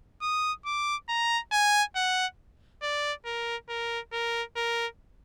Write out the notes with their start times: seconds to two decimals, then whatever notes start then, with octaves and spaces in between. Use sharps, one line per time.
0.22 D#6
0.66 D6
1.09 A#5
1.52 G#5
1.96 F#5
2.83 D5
3.26 A#4
3.69 A#4
4.13 A#4
4.56 A#4